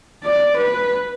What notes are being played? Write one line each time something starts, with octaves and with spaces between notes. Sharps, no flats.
D5
B4